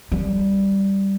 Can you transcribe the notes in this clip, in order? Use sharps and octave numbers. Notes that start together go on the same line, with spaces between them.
G3